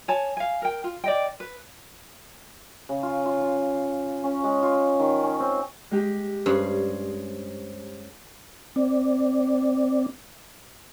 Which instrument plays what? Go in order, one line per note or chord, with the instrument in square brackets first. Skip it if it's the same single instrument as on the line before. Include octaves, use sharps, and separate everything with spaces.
[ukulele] C#5 G#5 A5
F5 G#5
A#4 G5
F4
D5 D#5 G5
B4
[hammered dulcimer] C#3
F4
F4
F4
C#4
G#3
F4
D#3
C#4
C4
[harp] G#3 G4
[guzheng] G2 [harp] C#4 G#4 C5
[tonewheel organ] C4 D5